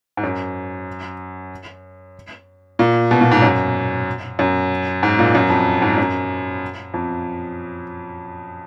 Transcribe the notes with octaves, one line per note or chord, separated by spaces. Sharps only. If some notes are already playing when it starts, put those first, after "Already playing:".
G#2
F#2
A#2
B2
A#2
G#2
F#2
F#2
G#2
A#2
F#2
F2
G#2
F#2
F2